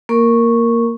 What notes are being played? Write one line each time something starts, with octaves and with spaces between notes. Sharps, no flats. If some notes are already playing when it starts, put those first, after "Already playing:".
A#3 A#4 C#6